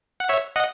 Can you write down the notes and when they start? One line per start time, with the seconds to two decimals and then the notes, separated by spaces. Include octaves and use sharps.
0.20 F#5
0.29 C#5 E5
0.56 D#5 F#5